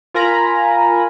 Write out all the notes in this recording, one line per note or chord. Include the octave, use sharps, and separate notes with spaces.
F4 A#4 G#5 A#5 B5